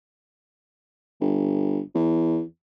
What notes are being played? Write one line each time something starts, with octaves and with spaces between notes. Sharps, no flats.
G1
E2